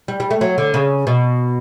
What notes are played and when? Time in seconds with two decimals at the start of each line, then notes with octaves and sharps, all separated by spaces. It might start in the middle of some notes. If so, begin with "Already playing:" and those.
0.08 G3
0.20 G3
0.31 A3
0.41 F#3
0.58 D3
0.74 C#3
1.07 B2